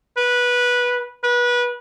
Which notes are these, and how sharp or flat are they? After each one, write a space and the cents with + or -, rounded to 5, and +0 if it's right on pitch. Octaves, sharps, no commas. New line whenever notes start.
B4 -15
B4 -25